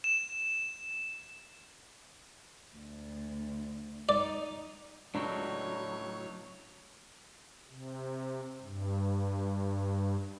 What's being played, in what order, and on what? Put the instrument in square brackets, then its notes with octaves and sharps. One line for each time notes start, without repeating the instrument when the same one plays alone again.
[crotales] E7
[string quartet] D2
[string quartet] D#4 [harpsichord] D5
[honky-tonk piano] C#2 [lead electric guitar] A2 F#3 [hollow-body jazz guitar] D4 [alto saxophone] C#5
[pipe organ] C3
G2